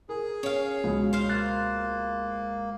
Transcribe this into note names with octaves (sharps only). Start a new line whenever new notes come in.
G#4 A#4
C#4 C#5 F5
C#2 B2
C5 F5
A#3 C6 F#6 A6